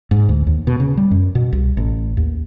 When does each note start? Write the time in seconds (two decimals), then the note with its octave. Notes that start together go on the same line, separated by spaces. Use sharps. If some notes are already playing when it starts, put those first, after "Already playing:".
0.11 G#2
0.29 D2
0.47 D#2
0.67 B2
0.80 C#3
0.97 G3
1.11 F#2
1.35 B2
1.53 C2
1.77 A1
2.17 D#2